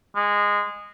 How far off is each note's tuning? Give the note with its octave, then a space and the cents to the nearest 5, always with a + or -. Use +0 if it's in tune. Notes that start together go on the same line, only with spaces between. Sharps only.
G#3 -15